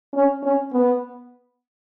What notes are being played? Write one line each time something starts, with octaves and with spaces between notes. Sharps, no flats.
C#4
C#4
B3